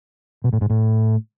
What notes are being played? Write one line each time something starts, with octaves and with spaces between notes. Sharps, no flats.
B2
A2
G#2
A2